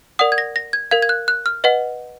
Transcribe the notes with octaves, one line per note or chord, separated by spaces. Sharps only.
A#4 D5 F#5 D#6
G#6
A#6
A#6
G#6
A#4 F5 G#6
G#6
F#6
F#6
F6
B4 D#5 F#5